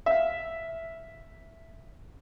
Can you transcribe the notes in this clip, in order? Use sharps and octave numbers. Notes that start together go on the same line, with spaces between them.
E5 F5